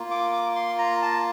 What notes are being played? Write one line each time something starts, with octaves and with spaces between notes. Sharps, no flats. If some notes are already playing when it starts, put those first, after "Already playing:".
Already playing: A#3 F4
D6
D6
C6
A#5
A5